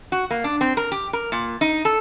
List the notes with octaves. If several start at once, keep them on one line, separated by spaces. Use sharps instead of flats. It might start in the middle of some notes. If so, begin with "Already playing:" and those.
F#4
A#3
D4
C4
A#4
G4
A#4
A#2
D#4
A4